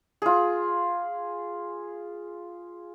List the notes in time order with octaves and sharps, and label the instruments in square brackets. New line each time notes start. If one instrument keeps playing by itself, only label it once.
[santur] F4 G#4